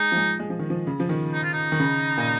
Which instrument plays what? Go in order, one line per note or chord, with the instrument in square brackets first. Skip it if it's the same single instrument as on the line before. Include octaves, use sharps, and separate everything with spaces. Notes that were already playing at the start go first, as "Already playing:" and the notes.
Already playing: [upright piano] G#3 [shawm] D#4
[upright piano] F3
G#3
G#3
F3
D#3
F3
C#3
F3
D#3
[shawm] D#4
F4
D#4
[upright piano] D#3
C#3
A#2